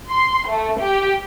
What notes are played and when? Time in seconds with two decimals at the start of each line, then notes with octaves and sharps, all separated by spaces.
0.10 C6
0.49 A3
0.81 G4